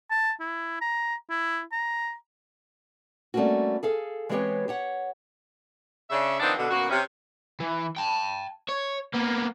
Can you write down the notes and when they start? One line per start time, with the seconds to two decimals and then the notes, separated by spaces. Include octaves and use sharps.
0.11 A5
0.40 E4
0.81 A#5
1.30 E4
1.72 A#5
3.34 G3 A3 A#3 C4 C#4 F#4
3.83 G#4 A4 F5
4.29 E3 G#3 B3 C4 G4 C#5
4.68 G4 C#5 F#5
6.10 C#3 D4 E5
6.40 D#3 F3 G3 B3 C4 D4
6.57 B2 D3
6.70 F#2 B2 A#3 F#4
6.90 C3 C#4
7.60 E3
7.96 G5 A5
8.69 C#5
9.14 A#3 B3